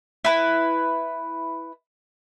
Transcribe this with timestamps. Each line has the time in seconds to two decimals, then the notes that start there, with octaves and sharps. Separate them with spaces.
0.25 E4 B4